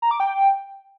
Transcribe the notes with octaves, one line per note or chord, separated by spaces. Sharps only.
A#5
D6
G5